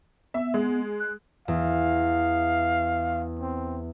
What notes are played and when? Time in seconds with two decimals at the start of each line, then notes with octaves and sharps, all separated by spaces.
0.34 B3 E5
0.54 G#3
1.00 F#6
1.48 E2 F5
3.39 C4